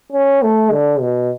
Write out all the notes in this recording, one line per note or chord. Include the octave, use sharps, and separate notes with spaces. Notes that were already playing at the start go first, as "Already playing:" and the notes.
C#4
A3
D3
B2